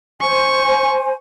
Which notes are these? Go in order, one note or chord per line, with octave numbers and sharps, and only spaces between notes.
C5 G#5 C#6